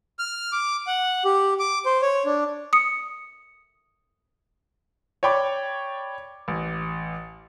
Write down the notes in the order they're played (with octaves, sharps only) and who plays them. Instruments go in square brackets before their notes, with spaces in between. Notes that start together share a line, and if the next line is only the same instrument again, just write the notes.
[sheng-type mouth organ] F6
D6
F#5
G4
D6
C5
C#5
D4
[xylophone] D#6 C#7
[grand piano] C#5 D5 G5 B5 D6
A1